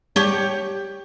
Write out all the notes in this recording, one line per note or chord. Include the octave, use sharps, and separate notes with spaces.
G4 C#5